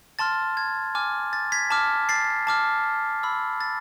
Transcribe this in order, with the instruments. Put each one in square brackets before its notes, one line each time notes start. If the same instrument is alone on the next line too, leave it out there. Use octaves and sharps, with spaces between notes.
[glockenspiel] A5 C6 F6 A6
G#6
G#5 D6 F6
A6
G#6 B6
A5 D6 F6
A6 C7
A5 D6 F6
B5 E6
A6